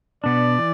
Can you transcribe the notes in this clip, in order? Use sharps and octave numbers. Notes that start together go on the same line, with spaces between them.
B2 B3 D4 D5
E3